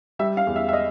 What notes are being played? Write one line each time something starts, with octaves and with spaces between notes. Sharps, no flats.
G3 E5
F5
E2
E5
E5
D#5